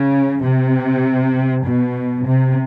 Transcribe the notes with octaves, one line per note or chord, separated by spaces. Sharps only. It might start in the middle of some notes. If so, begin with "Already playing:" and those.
Already playing: C#3
C3
B2
C3